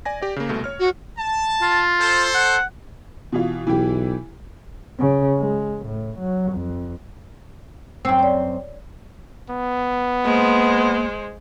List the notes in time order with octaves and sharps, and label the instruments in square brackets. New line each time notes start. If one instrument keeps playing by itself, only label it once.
[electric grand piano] D5 G#5 A#6
G4 D5
C#3 A#3
C2 B2 A3
C#5 F6
[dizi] F#4
[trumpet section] A5
[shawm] F4
[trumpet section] A4 C5
[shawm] F#5
[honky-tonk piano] B2 E3 F4
[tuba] B1 [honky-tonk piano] E3 E4 G4
[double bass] C#3
G#3
A2
F#3
F2
[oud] F#2 C4 [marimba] E6
[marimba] C#5 D5
[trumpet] B3
[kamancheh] G#3 C5 [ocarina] A#3